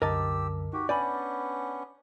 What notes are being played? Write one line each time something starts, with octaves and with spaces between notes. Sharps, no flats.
C2 F#2 D3 G4 A#4 D#5 A5 E6
D#4 F#4 G4
B3 C#4 D4 D5 G#5 B5 G6